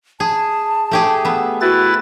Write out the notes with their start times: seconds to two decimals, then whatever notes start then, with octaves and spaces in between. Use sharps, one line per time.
0.20 G#4 A5
0.91 A3 G4 G#4
1.25 B3 E5
1.61 E4 F#4 B4 A6